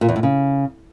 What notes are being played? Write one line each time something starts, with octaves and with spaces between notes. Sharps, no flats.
A#2
E2
A2
C#3